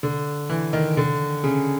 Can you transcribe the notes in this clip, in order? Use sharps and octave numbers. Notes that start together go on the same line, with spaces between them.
D3
E3
D#3
D3
C#3